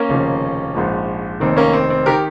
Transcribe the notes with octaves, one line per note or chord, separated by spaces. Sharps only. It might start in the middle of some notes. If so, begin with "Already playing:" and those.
Already playing: A#3 C#4
F1 D#2 C#3 F3
A#1 G#2 F3
F1 D#2 D#3 C4
A#3 C#4
C4
C4
D#3 G4 A#4